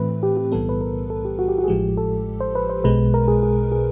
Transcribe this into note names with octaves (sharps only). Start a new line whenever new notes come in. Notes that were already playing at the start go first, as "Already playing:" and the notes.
Already playing: A2 E3 A3 C4 B4
G4
G4
B1 A2 E3 G3 B3 A4
B4
A#4
A4
G4
F#4
G4
F#4
G#4
A1 A2 F3 G#3 G4
A4
C5
B4
C5
B1 B2 G#3 B4
A#4
G#4
G#4
G#4